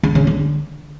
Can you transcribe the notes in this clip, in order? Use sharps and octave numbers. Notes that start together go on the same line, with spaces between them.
C#3
C#3
D3